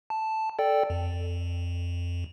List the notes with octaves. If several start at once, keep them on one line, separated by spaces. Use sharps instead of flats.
A5
A4 D5 G5
F2